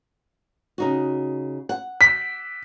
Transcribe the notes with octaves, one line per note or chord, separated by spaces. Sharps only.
C#3 D#4 F#4
F#5
B6